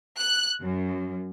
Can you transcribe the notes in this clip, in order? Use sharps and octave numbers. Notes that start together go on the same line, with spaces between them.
F#6
F#2